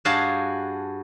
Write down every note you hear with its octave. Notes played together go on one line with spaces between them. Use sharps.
G2 F#4 G#4 F5 A5